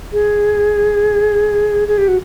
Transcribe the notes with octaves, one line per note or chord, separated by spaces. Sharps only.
G#4
G#4
G4
F#4